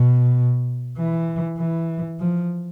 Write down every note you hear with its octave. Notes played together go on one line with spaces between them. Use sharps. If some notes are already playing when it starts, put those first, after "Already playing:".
Already playing: B2
E3
E3
F3